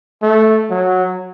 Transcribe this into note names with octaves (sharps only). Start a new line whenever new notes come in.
A3
F#3